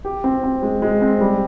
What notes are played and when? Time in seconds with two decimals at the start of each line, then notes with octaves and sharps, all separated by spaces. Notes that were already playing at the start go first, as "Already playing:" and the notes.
0.05 G4
0.24 C4
0.43 C4
0.62 G#3
0.82 G#3
1.01 C4
1.21 G3